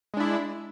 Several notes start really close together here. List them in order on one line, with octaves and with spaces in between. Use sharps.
G#3 D4 E4